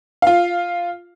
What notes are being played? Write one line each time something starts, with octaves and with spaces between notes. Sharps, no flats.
F4 F5